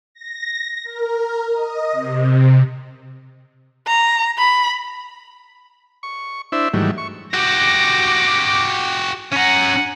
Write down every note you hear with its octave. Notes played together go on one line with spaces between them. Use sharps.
A#6
A#4
D#5
C3
A#5
B5
C#6
D4 E4 C5 E5
G#2 D#3 E3 F#3 G3 A3
C#6
F#4 G4 D6 A#6
C#4 F#5 G#5 A#5